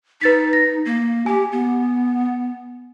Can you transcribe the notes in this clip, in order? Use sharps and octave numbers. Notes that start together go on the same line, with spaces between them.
D#4 B4 A6 B6
A#6
A#3
G4 G#5
B3